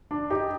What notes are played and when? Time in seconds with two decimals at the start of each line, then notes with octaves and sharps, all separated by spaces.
0.11 D4
0.30 D#4 G4